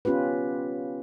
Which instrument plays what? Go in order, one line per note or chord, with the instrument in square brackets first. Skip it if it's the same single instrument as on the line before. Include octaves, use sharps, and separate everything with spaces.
[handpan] B3 C#4 F4 G4 B4